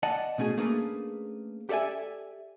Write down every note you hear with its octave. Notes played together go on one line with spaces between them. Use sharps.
D5 D#5 F#5 A5
B2 A3 C#4 G#4
A3 A#3 C#4 D4 G#4 B4
G4 A4 D5 E5 G#5